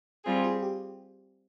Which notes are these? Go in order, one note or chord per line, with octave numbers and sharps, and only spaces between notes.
G3 C4 F4 G#4
F4 G#4
G4